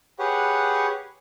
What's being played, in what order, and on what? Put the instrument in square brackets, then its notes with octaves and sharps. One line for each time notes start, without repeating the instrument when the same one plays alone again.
[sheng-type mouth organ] G4 G#4 B4 C#5 F#5